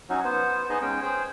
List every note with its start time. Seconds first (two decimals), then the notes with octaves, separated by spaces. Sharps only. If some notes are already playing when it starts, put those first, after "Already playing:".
0.09 F#3 C#4 D#4 F#4
0.24 B3 C5
0.70 B3 D#4 G#4 D#5
0.82 G#3 C#4 G5
1.02 G#4 C5 G5